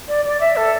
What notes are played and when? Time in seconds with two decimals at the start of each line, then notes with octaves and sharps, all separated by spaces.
0.08 D5
0.25 D5
0.40 E5
0.56 A4